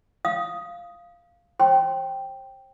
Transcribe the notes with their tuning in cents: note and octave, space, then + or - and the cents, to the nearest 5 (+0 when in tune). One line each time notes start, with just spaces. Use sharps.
F5 -5 D#6 +0
C5 +40 G5 +0 C6 +0